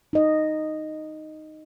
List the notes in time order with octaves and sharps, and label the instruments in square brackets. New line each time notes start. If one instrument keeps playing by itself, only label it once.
[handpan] D#4 D#5